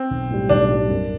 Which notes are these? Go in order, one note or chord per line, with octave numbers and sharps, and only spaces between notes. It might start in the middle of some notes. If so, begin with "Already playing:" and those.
Already playing: C4
B1
A2 G3
B1 D4
A2 G3
F#2